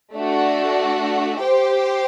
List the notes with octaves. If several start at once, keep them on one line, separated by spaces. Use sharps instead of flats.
A3 D4 F#4
G4 C5 G5